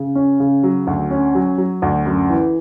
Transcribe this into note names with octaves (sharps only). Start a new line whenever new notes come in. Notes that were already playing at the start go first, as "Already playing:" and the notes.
Already playing: C#3
C#4
C#3
F#3
D2
C#4
F#3
F#3
D2
F#2
E3